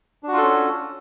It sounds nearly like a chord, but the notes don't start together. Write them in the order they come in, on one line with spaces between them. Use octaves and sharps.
D4 F#4 F4 A4 C#4